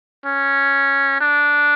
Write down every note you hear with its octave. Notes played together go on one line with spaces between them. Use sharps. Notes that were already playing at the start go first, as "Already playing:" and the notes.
C#4
D4